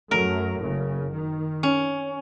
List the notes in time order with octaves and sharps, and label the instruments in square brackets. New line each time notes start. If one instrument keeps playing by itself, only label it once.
[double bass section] F#2 F#3 A3 [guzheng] A#4
[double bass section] F#1 C#3
D#3
[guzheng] C#4